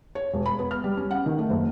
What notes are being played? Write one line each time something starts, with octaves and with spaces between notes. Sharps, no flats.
C#5
E1
B5
B3
F6
G3
C#4
F#5
D#3
A3
F#1